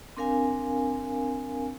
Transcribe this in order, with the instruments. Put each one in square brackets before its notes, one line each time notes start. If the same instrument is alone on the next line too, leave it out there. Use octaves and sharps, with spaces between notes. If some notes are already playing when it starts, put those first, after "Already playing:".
[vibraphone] C4 D4 A#4 F5 G#5